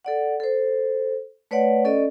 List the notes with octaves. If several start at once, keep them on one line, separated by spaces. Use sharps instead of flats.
A4 D5 F#5
A4 C5
A3 B4 C#5 D5 F#5
C#4 A4 D5 D#5